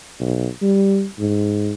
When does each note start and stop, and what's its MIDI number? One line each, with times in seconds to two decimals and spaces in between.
0.20 0.48 35
0.62 1.06 55
1.19 1.73 44